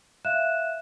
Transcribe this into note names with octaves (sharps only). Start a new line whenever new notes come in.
E5 F5 F#6 E7